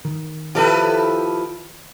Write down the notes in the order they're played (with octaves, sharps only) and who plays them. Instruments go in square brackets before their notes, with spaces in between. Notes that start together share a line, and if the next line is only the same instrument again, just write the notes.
[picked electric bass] D#3
[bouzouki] F3 E4 [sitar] G4 A4 B4